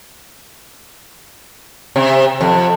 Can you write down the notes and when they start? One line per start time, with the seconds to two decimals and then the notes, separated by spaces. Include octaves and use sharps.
1.96 C3
2.41 F2